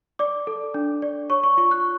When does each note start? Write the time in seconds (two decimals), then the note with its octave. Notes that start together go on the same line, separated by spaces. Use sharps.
0.19 D5 D6
0.47 A4
0.74 D4
1.02 D5
1.30 C#5 C#6
1.43 C#6
1.57 F4 C#6
1.71 F#6